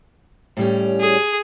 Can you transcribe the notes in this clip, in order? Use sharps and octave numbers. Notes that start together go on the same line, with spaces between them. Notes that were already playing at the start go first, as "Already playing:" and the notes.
A2 G3 C#4
G#4